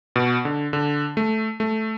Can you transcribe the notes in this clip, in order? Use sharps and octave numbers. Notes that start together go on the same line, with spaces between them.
B2
D3
D3
A3
A3